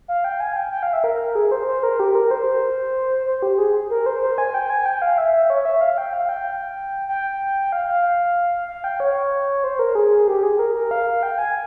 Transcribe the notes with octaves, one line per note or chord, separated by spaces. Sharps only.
F5
G5
G#5
G5
G5
F5
E5
A#4
G#4
C5
C5
A#4
G4
A#4
C5
C5
G4
G#4
A#4
C5
C5
G#5
G5
G#5
G5
F5
E5
E5
C#5
E5
F5
G5
F5
G5
G5
F5
F5
F5
G5
C#5
C5
A#4
G#4
G4
G#4
A#4
A#4
F5
G5
G#5